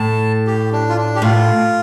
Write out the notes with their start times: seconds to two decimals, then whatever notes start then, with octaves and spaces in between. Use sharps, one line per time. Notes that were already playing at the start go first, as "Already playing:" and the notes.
Already playing: A2 A5
0.47 G4
0.72 D4
0.89 F4
0.97 D4
1.16 G4
1.22 A2 F4